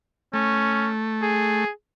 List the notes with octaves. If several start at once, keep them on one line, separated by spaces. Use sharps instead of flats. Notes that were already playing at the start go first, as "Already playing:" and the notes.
A3 C#4
G#4